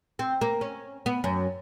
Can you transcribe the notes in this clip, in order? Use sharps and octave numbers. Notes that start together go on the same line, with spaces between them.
C4
A#3
C#4
B3
F#2